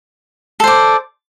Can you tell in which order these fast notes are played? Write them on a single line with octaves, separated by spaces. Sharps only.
A4 C5 D5